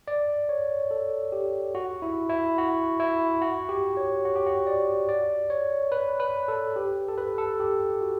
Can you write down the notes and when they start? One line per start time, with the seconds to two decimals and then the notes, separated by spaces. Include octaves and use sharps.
0.08 D5
0.49 C#5
0.91 A4
1.32 G4
1.75 F#4
2.02 E4
2.29 E4
2.58 F#4
3.00 E4
3.42 F#4
3.69 G4
3.97 C#5
4.25 F#4
4.36 G4
4.47 F#4
4.67 D5
5.09 D5
5.50 C#5
5.92 B4
6.20 B4
6.48 A4
6.76 G4
7.08 A4
7.18 B4
7.38 A4
7.60 G4
8.01 F#4